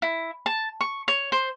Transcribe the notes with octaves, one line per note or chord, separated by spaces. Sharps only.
E4
A5
C#6
C#5
C5